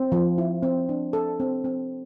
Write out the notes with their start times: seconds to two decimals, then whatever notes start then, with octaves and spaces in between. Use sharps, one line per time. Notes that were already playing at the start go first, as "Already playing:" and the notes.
Already playing: C4
0.12 F3
0.38 E4
0.63 C4
0.89 D4
1.13 A4
1.40 C4
1.64 C4